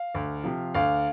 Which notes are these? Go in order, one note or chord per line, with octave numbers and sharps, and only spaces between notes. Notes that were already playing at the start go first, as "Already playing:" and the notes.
Already playing: F5
D2
C3 F3
D2 F5